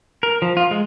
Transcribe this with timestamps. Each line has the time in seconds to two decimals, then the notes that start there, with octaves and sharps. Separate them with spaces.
0.23 A#4
0.42 F3
0.57 F4
0.71 G#3